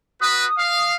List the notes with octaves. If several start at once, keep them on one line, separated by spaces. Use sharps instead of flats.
F#4 B4 D#6
F5